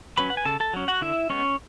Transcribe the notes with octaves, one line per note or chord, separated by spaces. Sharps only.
F#3 C#4 B4 B5
F#5
G#5
C#3 A4 A5
A4 A5
F#3 C#4
F#4 F#5
D3 E4 E5
G#3 B3 C#4 C#5